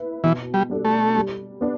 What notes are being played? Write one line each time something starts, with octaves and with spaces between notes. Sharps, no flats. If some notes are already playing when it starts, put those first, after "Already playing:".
Already playing: E4 B4
B2 E3
G3
G3 D4 A4
A3
G3
B3 D4